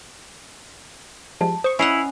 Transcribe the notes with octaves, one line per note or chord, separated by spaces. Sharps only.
F3 G3 G#3 A5
C5 C#6 D#6
C#4 E4 D#5 F#5 B5 C7 F7